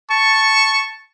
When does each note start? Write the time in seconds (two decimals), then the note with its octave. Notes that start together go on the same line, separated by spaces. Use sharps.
0.10 A5 C#6